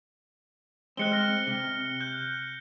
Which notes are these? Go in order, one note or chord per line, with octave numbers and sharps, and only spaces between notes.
G#3 C4 F#6 C#7 G7
F6 A#6
C3
F#6 G6